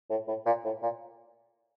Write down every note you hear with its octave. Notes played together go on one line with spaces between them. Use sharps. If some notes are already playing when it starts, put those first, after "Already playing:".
A2
A2
A#2
A2
A#2